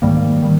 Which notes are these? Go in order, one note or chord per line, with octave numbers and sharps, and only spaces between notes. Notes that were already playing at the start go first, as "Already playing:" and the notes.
G#2 D#3 G3 A#3
D#3 G3